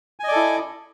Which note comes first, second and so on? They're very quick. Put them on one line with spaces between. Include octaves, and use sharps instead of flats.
G#5 D#5 D5 A4 E4